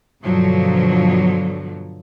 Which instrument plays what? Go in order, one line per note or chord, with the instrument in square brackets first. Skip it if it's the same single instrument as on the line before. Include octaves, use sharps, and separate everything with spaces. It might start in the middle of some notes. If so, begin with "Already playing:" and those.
[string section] G2 B2 D3 F3 F#3